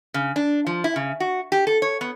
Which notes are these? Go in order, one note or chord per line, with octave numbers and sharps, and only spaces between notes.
C#3
D4
F3
E4
C#3
F#4
G4
A4
C#5
B3